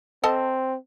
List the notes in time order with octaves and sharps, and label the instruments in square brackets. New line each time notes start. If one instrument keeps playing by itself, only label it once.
[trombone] C4 [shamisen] A4 D#5 A5